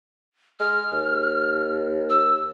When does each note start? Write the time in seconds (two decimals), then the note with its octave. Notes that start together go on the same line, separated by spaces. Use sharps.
0.60 G#3 F6
0.92 D#2
2.10 E6